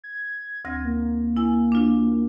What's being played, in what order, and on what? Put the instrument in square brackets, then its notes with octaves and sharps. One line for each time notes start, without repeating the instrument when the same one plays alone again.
[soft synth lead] G#6
[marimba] D2 C4 A#6
[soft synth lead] A#3
[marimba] E4 G#5
D4 F4